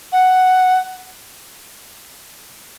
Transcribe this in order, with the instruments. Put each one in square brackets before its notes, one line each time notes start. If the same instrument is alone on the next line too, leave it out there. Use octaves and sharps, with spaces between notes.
[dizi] F#5